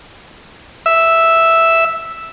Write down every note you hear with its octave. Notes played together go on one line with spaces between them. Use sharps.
E5